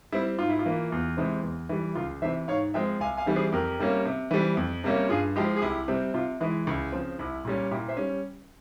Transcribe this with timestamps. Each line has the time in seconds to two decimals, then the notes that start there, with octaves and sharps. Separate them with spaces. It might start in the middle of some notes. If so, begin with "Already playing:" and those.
0.12 G3 C4 E4
0.39 G#2 F4
0.49 E4
0.59 F4
0.66 E3 A#3
0.92 E2
1.17 C3 E3 G#3 C4
1.43 E2
1.69 E3 G3
1.95 C#2 F4
2.22 C3 E3 C5 E5
2.48 G#2 C#5 F5
2.74 F3 G#3 C4 E5 G5
3.00 C2 F5 G#5
3.17 F5 G#5
3.26 C3 E3 G3
3.36 G#4 C5
3.52 F2 G4 A#4
3.79 C3 G3 A#3 C#4
4.05 C3
4.31 E3 G3 C4
4.57 F2
4.84 C3 G3 A#3 C#4
5.09 G2 F4 G#4
5.36 F3 G#3 E4 G4
5.56 G#4
5.62 C2 E4 G4
5.88 C3 G3 C4
6.14 C3 F4
6.40 E3 G#3 E4
6.67 C#2 E4
6.92 C#3 F3 C4
7.19 C2 E4
7.45 A#2 G3 C#4
7.71 A#2 E4 G4
7.88 C5 E5
7.97 G3 C#4